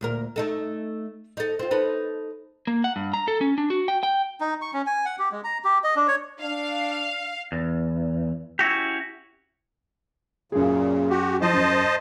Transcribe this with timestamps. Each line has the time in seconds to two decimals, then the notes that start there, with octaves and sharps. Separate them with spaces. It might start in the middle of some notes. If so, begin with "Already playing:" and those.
0.01 D2 A#2 A#4
0.36 A3 D#4 A4
1.37 D#4 A4
1.59 C4 F4
1.71 D#4 A4 B4
2.67 A#3
2.84 F#5
2.96 G2
3.14 A#5
3.28 A4
3.41 C#4
3.58 D4
3.70 F#4
3.88 G5
4.03 G5
4.41 D#4
4.62 C#6
4.74 C#4
4.86 G#5
5.05 F#5
5.19 G4
5.32 G#3
5.44 A#5
5.64 G4
5.84 D#5
5.96 D4
6.08 C#5
6.41 D4 F5
7.52 E2
8.59 C#4 E4 F#4 G4
10.52 F#2 A#2 C#3 G#4
11.10 F#4 G4
11.41 F3 E4 C5 D#5 A5
11.53 F#2
11.82 D#7